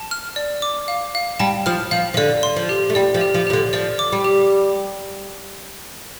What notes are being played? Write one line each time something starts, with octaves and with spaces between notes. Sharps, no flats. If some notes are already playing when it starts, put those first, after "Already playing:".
Already playing: A5
F6
D5
D6
F5
F5
G3 A5
F3 F6
F3 F5
F3
D3 D5
C6
F3
G4
A3
G3 D5
F3
G4
F3
F3 G4
D3
F3 D5
D6
G3
G4